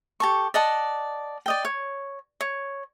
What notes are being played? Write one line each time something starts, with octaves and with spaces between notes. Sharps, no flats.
G4 A4 C#6
D5 D#5 F#5 A5
D5 D#5 G5
C#5
C#5